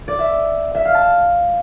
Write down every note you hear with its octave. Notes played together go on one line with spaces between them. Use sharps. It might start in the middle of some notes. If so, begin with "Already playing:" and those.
D5
E5
E5
F5
A5